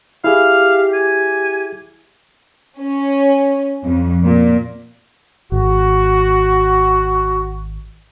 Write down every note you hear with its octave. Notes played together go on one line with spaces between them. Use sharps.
E4 G4 G#4 E5 F5
G#5
C#4
F2
A#2
G#1 F#4